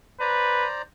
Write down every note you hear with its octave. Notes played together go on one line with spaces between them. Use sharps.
B4 C5 D5 A#5